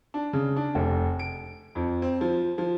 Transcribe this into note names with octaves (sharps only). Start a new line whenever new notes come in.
D4
C#3
D4
F1
D7
F2
C4
F3
F3